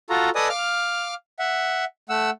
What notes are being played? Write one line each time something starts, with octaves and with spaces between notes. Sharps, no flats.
F4 F#4 A4 A#5
A4 B4 D5 D#5 G#5 D#6
F5 D6 F6
E5 F#5
A3 F#5 E6